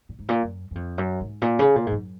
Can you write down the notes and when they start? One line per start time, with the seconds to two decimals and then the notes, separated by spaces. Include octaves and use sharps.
0.09 A#2
0.19 G#2
0.29 A#2
0.43 F#2
0.71 F#2
0.75 F2
0.98 F#2
1.21 G#2
1.42 A#2
1.59 C#3
1.76 A#2
1.86 G#2
1.91 F#2